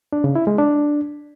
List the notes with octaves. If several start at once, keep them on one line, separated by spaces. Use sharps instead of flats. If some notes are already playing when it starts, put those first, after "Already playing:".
D4
C#3
E4
G#3
D4